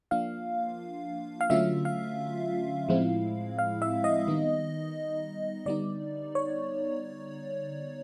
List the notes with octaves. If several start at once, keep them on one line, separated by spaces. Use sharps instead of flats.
F3 A#3 D4 F4 F5
F5
D3 F#3 A3 C#4 F4 E5
F5
A2 F3 G#3 C4 E4
F5
E5
D#5
D#3 G3 B3 D#4
D3 G3 B3 D#4 D5
C#5